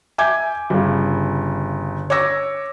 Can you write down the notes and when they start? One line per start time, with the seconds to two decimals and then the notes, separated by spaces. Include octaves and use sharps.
0.18 E5 G#5 D6 G6 G#6
0.70 G1 C#3
2.10 C#5 D6 E6 A#6